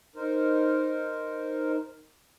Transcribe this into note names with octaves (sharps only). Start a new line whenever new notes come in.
D#4 A#4 C5